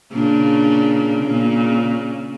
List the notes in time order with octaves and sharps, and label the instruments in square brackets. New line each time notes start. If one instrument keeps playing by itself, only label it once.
[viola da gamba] A#2 C#3 D4
A#2 C#3